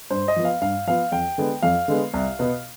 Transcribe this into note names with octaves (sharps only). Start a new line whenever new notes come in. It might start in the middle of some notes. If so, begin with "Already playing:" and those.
G2 C5
D#5
F3 B3
F5
G2 F5
F3 B3 F5
F2 G5
D3 G#3 B3
F2 F5
D3 G#3 B3
C2
B2 B3